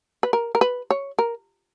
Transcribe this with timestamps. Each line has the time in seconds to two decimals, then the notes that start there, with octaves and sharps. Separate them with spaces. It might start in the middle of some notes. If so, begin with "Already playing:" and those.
0.23 B4
0.33 A#4
0.55 A#4
0.61 B4
0.90 C#5
1.19 A#4